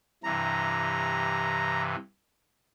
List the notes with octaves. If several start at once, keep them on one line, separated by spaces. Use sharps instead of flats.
G2 C3 E3 A#5